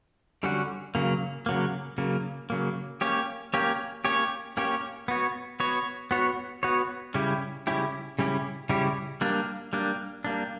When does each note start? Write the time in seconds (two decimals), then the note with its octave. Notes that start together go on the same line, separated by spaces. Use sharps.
0.43 D3 G3 C#4 F#4
0.95 C#3 F#3 A#3
1.46 C#3 F#3 A#3
1.98 C#3 F#3 A#3
2.50 C#3 F#3 A#3
3.01 A#3 C#4 G4 C#5
3.54 A#3 C#4 G4 C#5
4.05 A#3 C#4 G4 C#5
4.57 A#3 C#4 G4 C#5
5.08 B3 F#4 C#5
5.60 B3 F#4 C#5
6.11 B3 F#4 C#5
6.63 B3 F#4 C#5
7.14 C#3 G3 C#4 E4 G4
7.67 C#3 G3 C#4 E4 G4
8.19 C#3 G3 C#4 E4 G4
8.69 C#3 G3 C#4 E4 G4
9.21 G3 A#3 D4
9.73 G3 A#3 D4
10.24 G3 A#3 D4